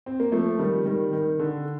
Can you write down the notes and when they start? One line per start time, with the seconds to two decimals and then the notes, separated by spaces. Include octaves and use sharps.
0.06 C4
0.20 A#3
0.32 F3 A3
0.59 D#3 G3
0.86 D#3 G3
1.13 D#3
1.39 D3